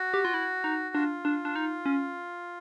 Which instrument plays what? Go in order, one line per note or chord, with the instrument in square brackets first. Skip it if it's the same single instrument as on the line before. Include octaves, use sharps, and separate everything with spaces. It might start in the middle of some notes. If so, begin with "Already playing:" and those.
Already playing: [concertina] F#4
[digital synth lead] G4
F4
E4
D#4
[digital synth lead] D4 [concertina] F4
[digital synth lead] D4
D4
D#4
C#4